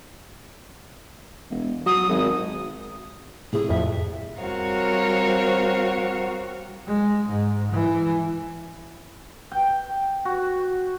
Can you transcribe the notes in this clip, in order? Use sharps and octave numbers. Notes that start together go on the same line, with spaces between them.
E1
F#3 D#6
G#1
A2 C3 E4 G#4
F2 E5
G3 C4 F#4 A#4 C#5 F5
G#3
G#2
E3
G5
F#4